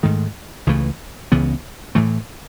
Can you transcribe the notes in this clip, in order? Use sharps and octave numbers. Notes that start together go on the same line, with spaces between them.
G#2 D#3 A3
C#2 C#3 E3 A3
C#2 C#3 E3 B3
A2 E3 A3